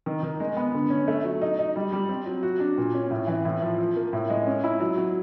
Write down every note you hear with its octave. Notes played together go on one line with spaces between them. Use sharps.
D#3
D#3
G#3
B3
D3
C#4
A3
F#3
D#4
D#4
G3
G3
C4
F#3
F#4
D4
A#2
C#4
A2
E3
A2
F3
F3
A#3
A2
G#3
C#4
E4
F#3
F#3